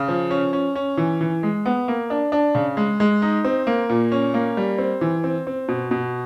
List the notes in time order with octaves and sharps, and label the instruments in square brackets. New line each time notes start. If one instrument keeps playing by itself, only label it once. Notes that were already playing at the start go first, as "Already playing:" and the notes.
Already playing: [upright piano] C#3
F3
C#4
C#4
C#4
E3
E3
G#3
B3
A#3
D4
D4
C#3
G#3
G#3
D#4
C4
A#3
A#2
C#4
A#3
G3
C4
E3
C4
C4
B2
B2